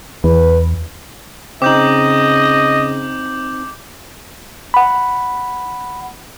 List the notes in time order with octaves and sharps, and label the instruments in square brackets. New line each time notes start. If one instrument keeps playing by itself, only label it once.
[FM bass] E2 [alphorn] B4
[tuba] C#3 [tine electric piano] C4 D#4 [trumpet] D#5 [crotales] D6 G6 F#7
[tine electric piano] F#5 B5